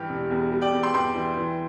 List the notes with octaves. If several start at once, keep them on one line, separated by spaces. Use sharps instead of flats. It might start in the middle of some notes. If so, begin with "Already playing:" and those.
Already playing: G2 E3 G3 G4
E1
E2
G3
D5 G5
E2
G5 C6
E2 G5 C6
E3
E3